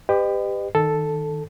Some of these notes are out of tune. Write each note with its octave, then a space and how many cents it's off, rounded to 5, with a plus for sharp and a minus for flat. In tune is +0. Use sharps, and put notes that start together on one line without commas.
G4 +15 B4 +35 D#5 -35
D#3 +0 A4 +0